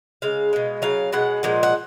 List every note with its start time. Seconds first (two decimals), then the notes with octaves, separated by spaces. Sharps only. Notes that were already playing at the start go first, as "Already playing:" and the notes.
0.22 C#3 G#3 F5
0.53 B2 G#3
0.82 C#3 F#3 F5
1.13 B2 G#3 F#5
1.43 A#2 F3 G#3
1.63 F#5